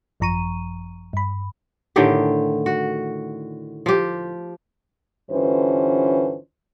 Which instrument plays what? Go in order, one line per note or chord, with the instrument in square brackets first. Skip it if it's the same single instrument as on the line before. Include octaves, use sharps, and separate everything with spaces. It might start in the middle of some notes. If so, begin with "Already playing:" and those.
[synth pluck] G#1 F#2 F3 A#5 C#6 D#7
G2 B5
[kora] A2 D3 D#3 G4
F#4
F3 G4
[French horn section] G2 D3 E3 C#4 F4 C5